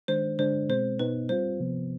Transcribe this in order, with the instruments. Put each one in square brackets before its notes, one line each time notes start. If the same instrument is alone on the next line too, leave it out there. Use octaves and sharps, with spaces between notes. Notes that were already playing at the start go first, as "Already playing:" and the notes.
[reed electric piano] D#3 G#3 D4 [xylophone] C5
[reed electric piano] D3 G#3 D4 [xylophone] C5
[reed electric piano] B2 G#3 C4 [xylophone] C5
[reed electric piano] B2 B3 D#4 [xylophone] B4
[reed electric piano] G3 C4 F4 [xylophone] C5
[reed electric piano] C3 F3 B3